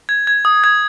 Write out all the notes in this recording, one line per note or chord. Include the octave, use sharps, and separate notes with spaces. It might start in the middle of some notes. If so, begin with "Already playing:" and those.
G#6
G#6
D#6
G#6